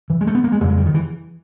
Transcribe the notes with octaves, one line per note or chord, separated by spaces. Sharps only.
E3
G#3
A3
B3
A#3
G#3
F2 C#3 G3
G#3
G3
D#3
E3